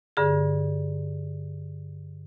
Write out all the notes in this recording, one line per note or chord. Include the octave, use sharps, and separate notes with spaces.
G2 D3 G#4